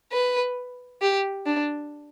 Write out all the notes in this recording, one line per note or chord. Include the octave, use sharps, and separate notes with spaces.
B4
G4
D4